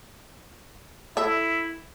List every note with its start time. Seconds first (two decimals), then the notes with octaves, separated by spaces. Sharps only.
1.17 E4 A4 E5